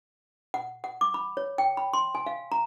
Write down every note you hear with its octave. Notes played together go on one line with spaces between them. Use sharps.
F#5
F#5
D6
B5
C#5
G5
B5
C6
G#5
F5
A#5